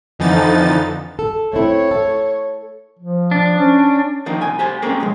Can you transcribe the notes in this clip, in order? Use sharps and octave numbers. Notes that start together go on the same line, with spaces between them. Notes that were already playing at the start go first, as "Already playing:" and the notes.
F2 D3 E3 F3 D#4 A6
A4
A3 C4 E4 C#5
A4
F3
D4
C#4
D#3 F3 A#3 D4
C2 G#5
G4 C5 G#5
A#3 C4 C#4 G4 G#4 A#4
B1 F2 G#3